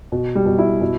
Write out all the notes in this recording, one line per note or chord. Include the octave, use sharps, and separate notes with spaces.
B2
G3
B2
E4
B2